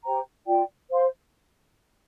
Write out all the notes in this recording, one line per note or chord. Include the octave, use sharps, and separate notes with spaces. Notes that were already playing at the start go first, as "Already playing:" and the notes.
G4 C5 G5 A#5
F4 D5 G5
C5 F5 C6